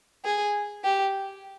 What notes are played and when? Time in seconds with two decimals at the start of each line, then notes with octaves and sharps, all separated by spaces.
0.25 G#4
0.84 G4